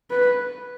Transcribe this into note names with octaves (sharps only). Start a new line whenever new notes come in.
B4